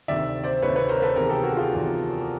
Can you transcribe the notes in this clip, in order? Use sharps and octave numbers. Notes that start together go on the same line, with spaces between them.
D2 C3 D#3 D5 E5
C5 D5
D2 C3 D#3 B4 C#5
B4 C#5
A#4 C5
A4 B4
E2 C3 D#3 G#4 A#4
G4 A4
F#4 G#4
F4 G4
E2 C3 D#3